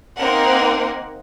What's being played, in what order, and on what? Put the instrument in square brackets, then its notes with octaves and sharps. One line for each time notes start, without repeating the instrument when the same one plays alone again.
[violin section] A#3 C4 D#4 A#4 F#5